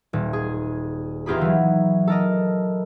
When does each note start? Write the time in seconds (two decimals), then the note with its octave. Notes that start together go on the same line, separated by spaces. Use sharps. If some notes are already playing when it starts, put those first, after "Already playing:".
0.13 D#1
0.33 G#4
1.26 E2 D#4 F4 G4 G#4 B5
1.41 E3 F#3
2.07 A4 A#4 D#5